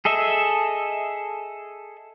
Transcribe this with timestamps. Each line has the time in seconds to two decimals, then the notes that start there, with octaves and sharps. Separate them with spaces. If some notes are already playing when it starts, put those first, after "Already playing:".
0.05 G#4 A4 D#5 E5